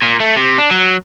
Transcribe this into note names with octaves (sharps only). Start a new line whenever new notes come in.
A#2
A3
C3
D4
F#3